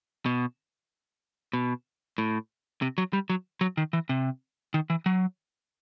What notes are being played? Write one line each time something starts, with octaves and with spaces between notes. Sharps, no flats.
B2
B2
A2
C3
F#3
G3
F#3
F#3
D#3
E3
C3
D#3
E3
F#3